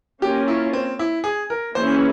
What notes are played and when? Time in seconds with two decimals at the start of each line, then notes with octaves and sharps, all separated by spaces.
0.22 A#3 C#4 F4 G4 A#4
0.48 E4
0.73 C4
0.99 E4
1.24 G#4
1.50 A#4
1.75 E3 A#3 C#4 E4 G#4 C5